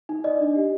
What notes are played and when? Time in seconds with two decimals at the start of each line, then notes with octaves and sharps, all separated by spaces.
0.09 D#4
0.24 D5 D#5
0.40 D4
0.55 G4